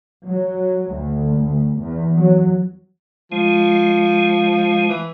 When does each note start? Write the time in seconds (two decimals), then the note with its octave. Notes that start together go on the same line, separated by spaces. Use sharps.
0.24 F#3
0.91 D2
1.37 D2
1.75 E2
2.16 F#3
3.32 F3 G#3
4.89 E3